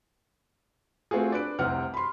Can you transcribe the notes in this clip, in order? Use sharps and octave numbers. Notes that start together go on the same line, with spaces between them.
A3 C4 F4 F#4 G#4
D4 B4 D7
F1 C2 C4 F#5 F6
B5 C6